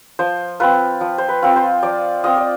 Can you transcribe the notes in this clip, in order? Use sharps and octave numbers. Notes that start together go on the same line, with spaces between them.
F3 C5
C4 F4 B4
F3
C5
B4
C4 F4
C5
F3 D5
C4 F4 D#5
D5